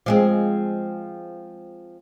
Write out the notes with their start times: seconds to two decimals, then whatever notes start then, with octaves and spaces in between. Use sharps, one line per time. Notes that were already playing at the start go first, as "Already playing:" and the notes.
0.06 F3 G#3 C4